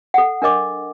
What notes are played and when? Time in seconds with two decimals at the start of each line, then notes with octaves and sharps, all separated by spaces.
0.14 A4 F#5
0.42 D4 A#4 D#5 D6